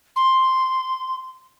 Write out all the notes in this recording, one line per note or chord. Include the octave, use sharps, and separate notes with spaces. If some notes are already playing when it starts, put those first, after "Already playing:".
C6